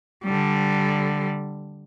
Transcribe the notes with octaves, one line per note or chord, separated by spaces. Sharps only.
D3 G3